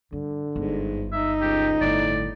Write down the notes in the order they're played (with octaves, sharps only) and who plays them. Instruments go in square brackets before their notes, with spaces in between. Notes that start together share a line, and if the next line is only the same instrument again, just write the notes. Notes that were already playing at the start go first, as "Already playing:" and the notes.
[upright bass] G2 [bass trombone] D3
[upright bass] G1 [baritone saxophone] G#2
[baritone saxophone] D#4 [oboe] E5
[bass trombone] C#2 [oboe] G4
[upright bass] G1 D3 [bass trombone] A2 [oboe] D5